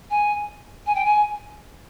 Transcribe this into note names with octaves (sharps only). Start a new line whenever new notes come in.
G#5
G#5
G5
G#5